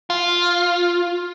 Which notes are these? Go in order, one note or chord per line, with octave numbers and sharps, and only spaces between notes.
F4